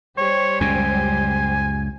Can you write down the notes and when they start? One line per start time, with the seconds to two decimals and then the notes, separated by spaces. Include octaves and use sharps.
0.18 G3 G4 C5 C#5
0.61 C#2 F#2 C#3 G#5